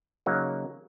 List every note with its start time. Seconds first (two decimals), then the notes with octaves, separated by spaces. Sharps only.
0.26 C#3 F#3 A#3 D#4 F#4